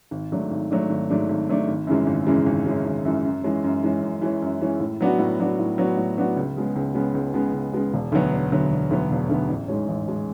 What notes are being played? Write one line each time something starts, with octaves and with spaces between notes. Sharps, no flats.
G#1
G#2 F#3 A3 D4
G#1
G#2 F#3 A3 D4
G#1
G#2 F#3 A3 D4
G#1
G#2 F#3 A3 D4
G#1
F#2 C#3 E3 G#3
G#1
F#2 C#3 E3 G#3
G#1
F#2 C#3 E3 G#3
G#1
F#2 C#3 E3 G#3
F#2
E3 G#3 C#4
F#2
E3 G#3 C#4
F#2
E3 G#3 C#4
F#2
E3 G#3 C#4
A2
F#3 B3 D4 F#4
A2
F#3 B3 D4 F#4
A2
F#3 B3 D4 F#4
A2
F#3 B3 D4 F#4
C#2
C#3 G#3 B3
C#2
C#3 G#3 B3
C#2
C#3 G#3 B3
C#2
C#3 G#3 B3
E1
D2 D3 F#3 B3
E1
D2 D3 F#3 B3
E1
D2 D3 F#3 B3
E1
D2 D3 F#3 B3
A1
G#2 G#3 C#4
A1
G#3 C#4